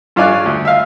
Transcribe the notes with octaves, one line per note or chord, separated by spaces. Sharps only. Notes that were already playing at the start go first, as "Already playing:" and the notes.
G2 F4 C#5 D5 G#5 F#6
D2
E5 F5